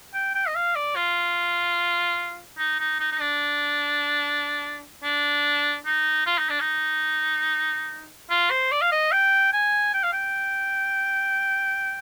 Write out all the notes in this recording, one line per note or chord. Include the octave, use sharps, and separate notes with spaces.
G5
G5
D#5
F5
D5
F4
D#4
D#4
D#4
D#4
D4
D4
D#4
F4
D#4
D4
D#4
F4
C5
D5
F5
D#5
G5
G#5
G5
F5
G5